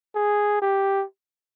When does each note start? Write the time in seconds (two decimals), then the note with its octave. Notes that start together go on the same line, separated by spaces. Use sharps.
0.15 G#4
0.62 G4